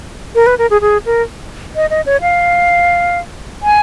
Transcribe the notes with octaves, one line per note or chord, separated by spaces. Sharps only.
A#4
B4
A#4
G#4
G#4
A#4
D#5
D#5
C#5
F5
G#5